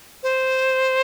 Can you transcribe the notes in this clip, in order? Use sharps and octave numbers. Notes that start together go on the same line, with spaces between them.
C5